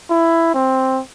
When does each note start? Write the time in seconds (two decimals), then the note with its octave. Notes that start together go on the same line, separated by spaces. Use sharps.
0.10 E4
0.54 C4